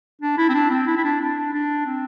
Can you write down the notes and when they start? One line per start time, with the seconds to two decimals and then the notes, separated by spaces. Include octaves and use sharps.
0.22 D4
0.38 E4
0.49 C4
0.55 D4
0.71 C4
0.87 E4
0.97 E4
1.04 D4
1.20 D4
1.53 D4
1.85 C4